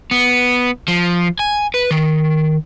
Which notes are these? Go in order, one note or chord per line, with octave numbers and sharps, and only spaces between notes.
B3
F3
G#5
B4
D#3